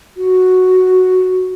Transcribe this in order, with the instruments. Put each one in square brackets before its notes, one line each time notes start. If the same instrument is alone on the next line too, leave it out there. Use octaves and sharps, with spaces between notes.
[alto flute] F#4